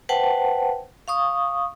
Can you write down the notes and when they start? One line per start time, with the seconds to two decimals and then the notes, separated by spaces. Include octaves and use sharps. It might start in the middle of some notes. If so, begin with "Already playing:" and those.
0.09 B4 C5 F#5 G5 A5
1.08 F5 C#6 D#6